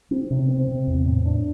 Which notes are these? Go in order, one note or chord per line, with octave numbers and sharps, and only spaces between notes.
C4
C3
C4
C3
E2
A2
D4